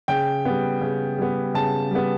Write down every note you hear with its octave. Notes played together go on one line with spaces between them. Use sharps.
C#3 G5
G3 B3
C#3
G3 B3
C#3 A5
G3 B3